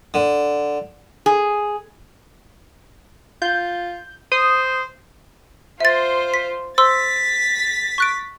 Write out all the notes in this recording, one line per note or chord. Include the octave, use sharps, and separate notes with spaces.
D3
G#4
F4 G6
C5 D#6
F4 C5 E5 A6
B6
C5 C6 E6 A6 B6
C#6 F#6 D7